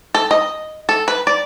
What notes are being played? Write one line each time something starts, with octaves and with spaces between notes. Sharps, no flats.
A4
D#5
A4
B4
D5